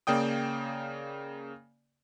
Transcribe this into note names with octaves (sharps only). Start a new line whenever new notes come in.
C#3 A#3 D5 G5 D#6